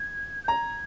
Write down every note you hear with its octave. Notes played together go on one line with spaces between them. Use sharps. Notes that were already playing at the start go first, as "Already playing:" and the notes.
Already playing: G#6
G6
A#5 G#6